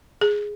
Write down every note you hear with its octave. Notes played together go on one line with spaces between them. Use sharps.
G#4